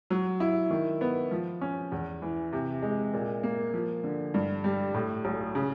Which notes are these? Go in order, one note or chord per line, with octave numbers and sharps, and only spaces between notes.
F#3
E4
D#3
B3
F3
C#4
E2
E3
C3
G#3
A#2
A#3
F3
D3
G2
G3
A2
B1
C#3